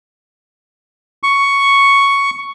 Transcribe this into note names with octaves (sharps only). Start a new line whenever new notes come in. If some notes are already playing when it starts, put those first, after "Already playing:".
C#6